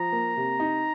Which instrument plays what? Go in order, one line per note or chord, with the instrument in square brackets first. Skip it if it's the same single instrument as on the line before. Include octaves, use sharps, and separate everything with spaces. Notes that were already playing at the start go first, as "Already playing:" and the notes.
Already playing: [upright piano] F3 [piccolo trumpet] A#5
[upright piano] A#3
C3
D#4